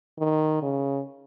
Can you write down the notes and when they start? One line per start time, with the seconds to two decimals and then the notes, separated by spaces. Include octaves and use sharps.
0.19 D#3
0.62 C#3